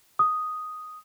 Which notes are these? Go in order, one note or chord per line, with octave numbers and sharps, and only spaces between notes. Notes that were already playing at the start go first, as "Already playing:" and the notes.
D#6